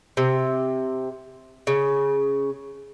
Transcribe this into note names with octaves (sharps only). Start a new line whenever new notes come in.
C3
C#3